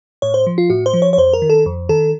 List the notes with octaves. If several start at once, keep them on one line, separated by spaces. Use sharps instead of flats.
A2 C#5
C5
F3
F4
A2 F#4
C5
F3
C#5
C#5
F2 C5
A#4
D#3
A4
F2
D#3 A4